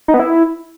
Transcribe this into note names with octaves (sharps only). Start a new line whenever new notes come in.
D#4
B3
E4